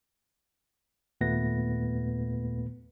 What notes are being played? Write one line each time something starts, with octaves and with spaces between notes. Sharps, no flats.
D#2 A#2 A3 B3 B4 A#6